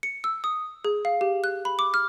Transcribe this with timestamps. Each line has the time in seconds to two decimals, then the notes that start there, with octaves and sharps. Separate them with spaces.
0.03 C#7
0.24 E6
0.44 D#6
0.85 G#4
1.05 F5
1.21 G4
1.44 F#6
1.65 B5
1.79 D6
1.94 F6